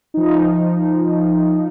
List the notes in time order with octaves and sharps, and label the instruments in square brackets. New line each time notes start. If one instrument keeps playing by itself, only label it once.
[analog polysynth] F3 D#4